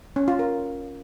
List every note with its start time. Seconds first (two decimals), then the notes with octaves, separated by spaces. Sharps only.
0.16 C#4
0.28 F4
0.39 A#4